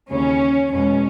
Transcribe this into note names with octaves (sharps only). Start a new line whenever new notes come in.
D#2 C#3 E3 C#4
E2 B2 G#3 C#4